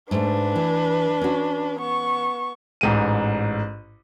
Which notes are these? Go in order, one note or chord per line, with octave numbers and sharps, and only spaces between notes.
G#2 A3 D4 B4
E3
C#4 F#4
B3 C#6
A1 G#2 D#7